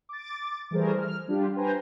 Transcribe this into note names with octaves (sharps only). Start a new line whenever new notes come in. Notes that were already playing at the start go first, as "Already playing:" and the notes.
D6 A6
E3 G3 A3 G#4 A#4 C5
F6
G3 D4 F4 G4
B4 C5 G5 G#5 A#5